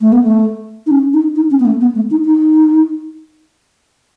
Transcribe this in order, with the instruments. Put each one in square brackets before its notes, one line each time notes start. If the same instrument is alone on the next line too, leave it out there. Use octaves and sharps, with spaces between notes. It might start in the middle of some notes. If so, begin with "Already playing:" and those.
[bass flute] A3
B3
A3
D#4
C#4
D#4
D#4
C#4
B3
A3
B3
A3
D#4
D#4